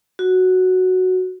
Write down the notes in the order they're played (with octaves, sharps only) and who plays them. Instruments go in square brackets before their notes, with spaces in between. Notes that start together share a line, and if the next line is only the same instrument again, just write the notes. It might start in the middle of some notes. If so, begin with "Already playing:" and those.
[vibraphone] F#4